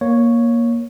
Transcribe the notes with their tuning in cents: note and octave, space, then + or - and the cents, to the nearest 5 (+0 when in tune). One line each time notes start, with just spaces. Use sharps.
A#3 +15 C#5 +0